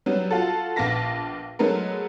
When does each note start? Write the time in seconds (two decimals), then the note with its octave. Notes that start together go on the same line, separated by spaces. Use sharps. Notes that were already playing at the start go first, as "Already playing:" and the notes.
0.06 F#3 G3 B3
0.31 F4 F#4 A4
0.76 A#1 B3 F5 A5 A#6 B6
1.59 F#3 G#3 A3 B3 A#4